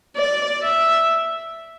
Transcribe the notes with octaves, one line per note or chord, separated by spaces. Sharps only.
D5
E5